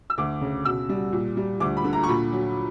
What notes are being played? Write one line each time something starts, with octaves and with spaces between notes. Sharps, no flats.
E6
D2 D6
C#3
B2 E6
G3
A#2
G3
D2 D6
B5
D3
A#5
C#6
A#2 B5
F#3